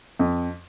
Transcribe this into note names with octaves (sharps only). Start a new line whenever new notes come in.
F2